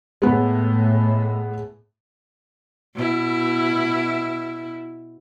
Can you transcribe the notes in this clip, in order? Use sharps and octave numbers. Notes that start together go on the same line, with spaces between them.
A2 G#3 B3
B2 E4